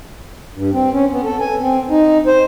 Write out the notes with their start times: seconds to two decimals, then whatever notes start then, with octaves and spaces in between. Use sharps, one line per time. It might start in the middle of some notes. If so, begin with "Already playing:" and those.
0.55 G2
0.73 C4
0.93 C#4
1.12 B3
1.24 A4
1.40 G#5
1.61 C4
1.90 D#4
2.27 C5